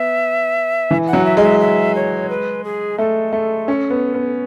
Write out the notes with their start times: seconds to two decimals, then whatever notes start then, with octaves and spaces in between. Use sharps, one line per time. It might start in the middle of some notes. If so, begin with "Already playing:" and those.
Already playing: B3 E5
0.91 E3
1.07 F#5
1.13 F#3
1.25 E5
1.37 G#3 D#5
1.43 E5
1.60 E5
1.95 C#5
2.30 B4
2.64 G#4
2.98 A3 A4
3.33 A3
3.68 C#4
3.90 B3
4.14 B3